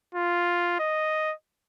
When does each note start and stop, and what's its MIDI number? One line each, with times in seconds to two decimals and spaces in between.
0.15 0.75 65
0.79 1.33 75